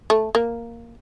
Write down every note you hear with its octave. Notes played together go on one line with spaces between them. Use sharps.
A3
A#3